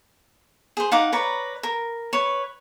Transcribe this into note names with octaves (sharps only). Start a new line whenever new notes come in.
G#4 C5
D#4 F5 F#5 D6
B4 C#5 D5 A#5
A#4
B4 C#5